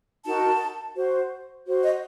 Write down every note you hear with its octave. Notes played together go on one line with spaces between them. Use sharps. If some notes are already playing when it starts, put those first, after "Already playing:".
D#4 F#4 A#4 A5
F#4 C5
F#4 C5
D#5